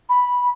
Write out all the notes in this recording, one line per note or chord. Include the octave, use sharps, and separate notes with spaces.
B5